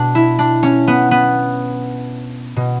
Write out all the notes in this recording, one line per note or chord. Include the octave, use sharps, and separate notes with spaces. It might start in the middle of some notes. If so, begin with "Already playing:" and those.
Already playing: B2 D4
E4
D4
C#4
B3
B3
B2